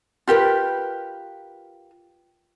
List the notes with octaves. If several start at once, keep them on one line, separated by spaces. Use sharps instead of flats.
F4 G4 A#4 B4